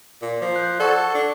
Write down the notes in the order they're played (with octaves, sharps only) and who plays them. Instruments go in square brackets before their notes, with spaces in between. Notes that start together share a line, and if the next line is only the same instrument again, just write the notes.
[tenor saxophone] A#2
F3
[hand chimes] F#6 G6
[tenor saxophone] A4 [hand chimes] D5 F#5 C#6
[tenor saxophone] D4